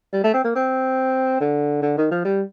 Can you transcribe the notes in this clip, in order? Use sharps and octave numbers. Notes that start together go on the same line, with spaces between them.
G3
A3
C4
A#3
C4
D3
D3
D#3
F3
G3